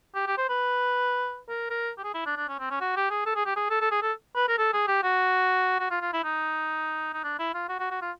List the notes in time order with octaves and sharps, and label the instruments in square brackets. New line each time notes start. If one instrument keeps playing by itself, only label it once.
[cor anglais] G4
G4
C5
B4
A#4
A#4
G4
G#4
E4
D4
D4
C#4
C4
C#4
F#4
G4
G#4
A4
G#4
G4
G#4
A4
A4
G#4
A4
B4
A#4
A4
G#4
G4
F#4
F#4
F4
F4
E4
D#4
D#4
D4
E4
F4
F#4
F#4
F#4
F4